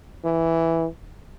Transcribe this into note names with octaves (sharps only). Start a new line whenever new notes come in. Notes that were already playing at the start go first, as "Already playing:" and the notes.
E3